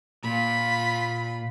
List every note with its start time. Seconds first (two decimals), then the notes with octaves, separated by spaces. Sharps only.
0.24 A#2 F4 B5